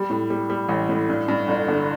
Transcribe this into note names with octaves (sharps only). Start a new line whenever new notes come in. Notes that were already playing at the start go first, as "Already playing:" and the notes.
Already playing: G3
A2
G3
G3
A1
A2
G2
G2
G1
D3